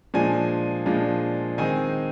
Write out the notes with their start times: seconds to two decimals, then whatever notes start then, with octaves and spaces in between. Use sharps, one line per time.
0.14 A#2 F3 G#3 D4 G#5
0.86 A#2 F3 G#3 D4
1.58 D#3 G#3 C4 D#4 G#5